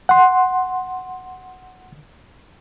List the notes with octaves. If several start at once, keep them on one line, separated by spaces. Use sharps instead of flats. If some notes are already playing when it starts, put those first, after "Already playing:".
F#5 C6